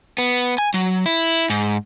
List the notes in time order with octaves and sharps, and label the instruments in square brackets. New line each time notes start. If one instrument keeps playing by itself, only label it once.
[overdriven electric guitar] B3
G#5
F#3
E4
G#2